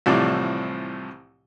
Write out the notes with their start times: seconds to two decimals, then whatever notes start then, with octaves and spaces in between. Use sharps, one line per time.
0.06 C2 A2 C3 E3 F3 D5